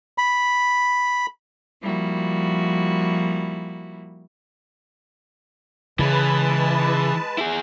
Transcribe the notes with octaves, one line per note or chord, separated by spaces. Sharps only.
B5
F3 G3 A#3 E4 F#4
C#3 E3 G#3 B4 A5
E4 G#4